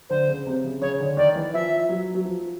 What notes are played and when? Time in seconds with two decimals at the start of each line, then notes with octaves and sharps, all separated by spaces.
0.10 D3 C5
0.28 C#3
0.47 C3
0.64 C#3
0.81 C#3 C#5
1.00 D3
1.17 D#3 D5
1.36 E3
1.54 F3 E5
1.89 F#3
2.15 F#3
2.25 F3